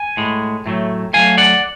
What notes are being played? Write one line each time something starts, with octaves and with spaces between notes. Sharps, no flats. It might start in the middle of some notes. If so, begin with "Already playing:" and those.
Already playing: G#5
A2 G#3
A2 F#3 A3
A2 F#3 A3 F5 G#5
D5 F#5